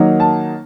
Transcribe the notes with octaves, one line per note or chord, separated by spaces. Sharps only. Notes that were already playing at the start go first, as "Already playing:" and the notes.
Already playing: D#3 F#3 A#3 D#4
A5